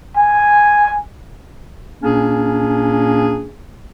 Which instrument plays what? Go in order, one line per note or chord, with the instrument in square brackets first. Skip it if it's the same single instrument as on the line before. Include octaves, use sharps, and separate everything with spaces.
[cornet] G#5
[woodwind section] A#2 A#3 C#4 D4 G#4